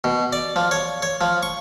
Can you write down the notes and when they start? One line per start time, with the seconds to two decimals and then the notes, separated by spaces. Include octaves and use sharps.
0.04 B2
0.33 D5
0.56 F3
0.71 C#5
1.02 C#5
1.21 F3
1.43 C#6